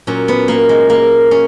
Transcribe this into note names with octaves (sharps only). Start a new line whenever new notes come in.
A#2 F#3 C#4
B3
A#3
G#3
A#3
C#4